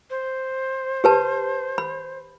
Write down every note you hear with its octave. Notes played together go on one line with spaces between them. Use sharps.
C5
G4 B4 A5
B5